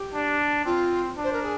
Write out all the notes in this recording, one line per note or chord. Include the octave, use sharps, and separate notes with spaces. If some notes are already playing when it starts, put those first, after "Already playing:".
Already playing: G4
D4
C4 F4
D4
C5
A#4
G#4